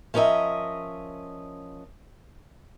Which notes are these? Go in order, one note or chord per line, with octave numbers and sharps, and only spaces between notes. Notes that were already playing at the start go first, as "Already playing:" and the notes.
F3 C#4 A#4 D#5 E5